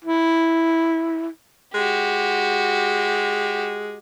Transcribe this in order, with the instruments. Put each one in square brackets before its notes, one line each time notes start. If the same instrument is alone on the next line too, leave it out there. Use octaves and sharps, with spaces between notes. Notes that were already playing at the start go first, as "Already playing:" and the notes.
[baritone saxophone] E4
[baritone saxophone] G#3 [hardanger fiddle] F#4 G4